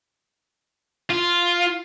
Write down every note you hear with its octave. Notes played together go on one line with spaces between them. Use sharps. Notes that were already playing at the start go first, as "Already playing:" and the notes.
F4